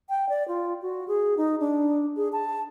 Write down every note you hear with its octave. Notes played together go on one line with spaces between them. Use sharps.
G5
D5
F4
F#4
G#4
D#4
D4
G#4
A5